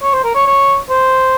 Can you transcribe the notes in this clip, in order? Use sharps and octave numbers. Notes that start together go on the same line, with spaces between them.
C#5
C5
A#4
C#5
C#5
C5